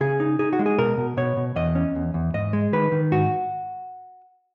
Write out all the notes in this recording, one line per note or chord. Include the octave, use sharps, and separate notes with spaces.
C#3 G#4
D#4
D#4 G#4
F#4
G#3
G#4
B2 A#4
B2
B2 C#5
B2
E2 D#5
C#4
E2
E2
G#2 D#5
G#3
D#3 B4
D#3
G#2 F#4